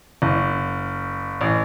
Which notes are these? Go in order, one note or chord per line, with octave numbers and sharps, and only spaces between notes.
F#1
A1